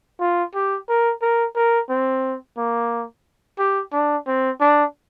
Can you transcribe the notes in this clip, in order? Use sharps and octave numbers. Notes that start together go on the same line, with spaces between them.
F4
G4
A#4
A#4
A#4
C4
A#3
G4
D4
C4
D4